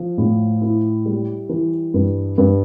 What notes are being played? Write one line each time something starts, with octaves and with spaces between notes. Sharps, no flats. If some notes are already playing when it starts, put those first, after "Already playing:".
Already playing: F3
A2
E4
G3
E3
G2
G2